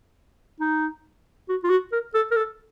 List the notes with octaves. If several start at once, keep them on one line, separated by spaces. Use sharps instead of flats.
D#4
F#4
F4
F#4
A#4
A4
A#4
A4